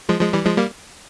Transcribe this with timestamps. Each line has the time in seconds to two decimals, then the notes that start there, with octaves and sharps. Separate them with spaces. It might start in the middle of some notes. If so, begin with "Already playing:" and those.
0.09 F3 G#3
0.21 F3 G#3
0.33 E3 G3
0.45 F3 G#3
0.58 G3 A#3